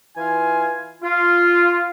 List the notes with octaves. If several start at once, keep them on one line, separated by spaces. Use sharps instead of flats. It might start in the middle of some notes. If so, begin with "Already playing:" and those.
E3 F4 G#5
F4